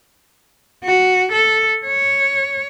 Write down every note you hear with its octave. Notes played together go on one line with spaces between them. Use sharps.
F#4
A4
C#5